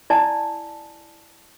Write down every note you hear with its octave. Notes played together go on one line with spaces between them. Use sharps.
E4 D5 G#5 A5